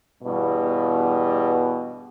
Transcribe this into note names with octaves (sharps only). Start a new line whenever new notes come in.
E2 G2 B2